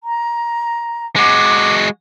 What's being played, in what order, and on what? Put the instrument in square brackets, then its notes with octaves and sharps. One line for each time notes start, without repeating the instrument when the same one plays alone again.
[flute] A#5
[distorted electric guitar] G#3 F#4 [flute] D6